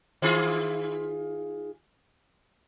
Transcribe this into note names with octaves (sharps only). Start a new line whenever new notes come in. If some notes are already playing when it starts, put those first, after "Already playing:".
D#3 F4 G#4